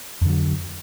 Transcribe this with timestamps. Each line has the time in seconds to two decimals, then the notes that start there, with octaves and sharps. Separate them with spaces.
0.22 F2
0.25 D3
0.29 F#3